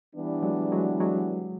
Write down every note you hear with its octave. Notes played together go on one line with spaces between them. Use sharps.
E3 G3 B3 D4
F#3 G#3
F#3 G#3
F#3 G#3